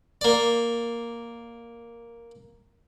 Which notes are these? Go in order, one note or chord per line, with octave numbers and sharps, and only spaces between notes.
A#3 D5